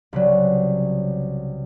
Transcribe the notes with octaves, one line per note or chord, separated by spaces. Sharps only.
C2 C#3 F#3